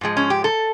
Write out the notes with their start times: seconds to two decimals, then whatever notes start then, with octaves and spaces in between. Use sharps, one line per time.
0.01 G#2 F3 G#3
0.17 C#4
0.30 G4
0.44 A4